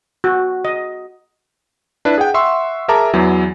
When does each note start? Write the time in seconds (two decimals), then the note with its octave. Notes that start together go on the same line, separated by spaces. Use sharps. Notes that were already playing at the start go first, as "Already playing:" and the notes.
0.24 F#4
0.65 D#5
2.05 D4 E4 B4
2.18 G#4 F#5 G5
2.34 E5 F#5 C6 C#6 E6
2.88 G#4 A#4 E5 A5 A#5 D6
3.14 E2 E3 F#3